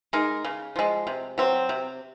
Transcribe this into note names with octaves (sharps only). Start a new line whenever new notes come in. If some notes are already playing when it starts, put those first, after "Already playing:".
G#3 D#4 A#4
C#3
F3 G#3
C3
F#3 C4
C3